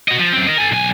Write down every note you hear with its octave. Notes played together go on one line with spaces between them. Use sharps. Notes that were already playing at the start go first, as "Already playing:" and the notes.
F#4 D#5
F3
F#2 C4
A#4 D#5
A4 G#5
B1 G#5